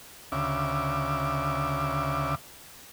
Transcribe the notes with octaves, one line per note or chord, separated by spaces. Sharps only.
D2 C#3 E5 D6